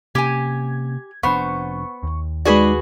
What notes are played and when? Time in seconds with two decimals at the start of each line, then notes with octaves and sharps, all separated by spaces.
0.15 C3 A#3 C#4 G4 G#5 G#6
1.23 F1 F2 B3 D4 C5 C#6
2.03 D#2
2.45 G#3 D#4 F#4 G#4 B4 D5